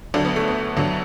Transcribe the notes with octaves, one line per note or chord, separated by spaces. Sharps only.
D2 D3 F#3 D4
B3
A3
B3
D2 D3 F#3